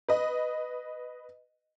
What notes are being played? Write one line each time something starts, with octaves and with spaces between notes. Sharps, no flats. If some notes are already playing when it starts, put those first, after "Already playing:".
B4 D#5